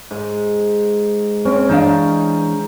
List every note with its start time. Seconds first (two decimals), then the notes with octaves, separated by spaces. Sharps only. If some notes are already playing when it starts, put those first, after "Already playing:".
0.11 G#2
1.45 C4 C#4
1.69 E3 D4 D#4 F5